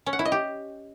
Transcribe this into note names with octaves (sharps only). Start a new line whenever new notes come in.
C#4
F#5
E4
D#5
G4